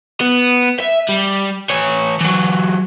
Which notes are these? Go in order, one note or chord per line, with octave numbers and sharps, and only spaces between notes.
B3
E5
G3
E3 C#5
E3 F#3